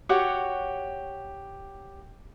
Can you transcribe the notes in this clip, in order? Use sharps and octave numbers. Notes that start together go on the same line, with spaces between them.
F#4 G4 C#5 F#5